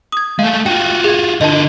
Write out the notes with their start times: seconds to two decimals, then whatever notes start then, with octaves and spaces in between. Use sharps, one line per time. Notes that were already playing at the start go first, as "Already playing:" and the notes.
0.12 D#6 G#6
0.39 G#3 A3 F5
0.66 F4 F#4 G5
1.04 G#4 G#6
1.41 D3 A#4 D#5 A5